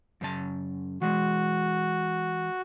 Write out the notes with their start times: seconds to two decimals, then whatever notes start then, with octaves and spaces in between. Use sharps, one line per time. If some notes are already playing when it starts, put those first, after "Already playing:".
0.21 F#2 C#3 A5
1.02 E3 G#3 F#4